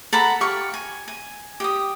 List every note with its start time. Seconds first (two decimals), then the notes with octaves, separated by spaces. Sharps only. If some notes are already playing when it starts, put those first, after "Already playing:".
0.13 A4 F#5 A#5 B5
0.41 G4 F5 C#6
0.74 G#5
1.08 G#5
1.60 G4 D#6